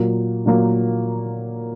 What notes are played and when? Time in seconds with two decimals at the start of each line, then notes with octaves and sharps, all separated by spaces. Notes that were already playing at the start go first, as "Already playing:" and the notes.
Already playing: A#2 F#3 A#3
0.46 A#2 F#3 A#3